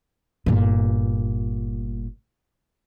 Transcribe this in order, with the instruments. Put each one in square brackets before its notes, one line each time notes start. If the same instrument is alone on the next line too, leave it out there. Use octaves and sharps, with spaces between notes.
[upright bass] G1 A#2